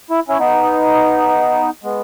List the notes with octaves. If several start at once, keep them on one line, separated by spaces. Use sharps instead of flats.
E4
C#4 E4
B3 D#4
G#3 B3